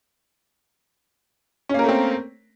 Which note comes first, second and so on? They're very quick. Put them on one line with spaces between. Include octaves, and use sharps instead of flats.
C#4 A#3 A#4 A3 C4